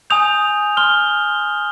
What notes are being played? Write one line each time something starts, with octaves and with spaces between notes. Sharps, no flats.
G#5 D#6 G6 F7
C6 F6 G7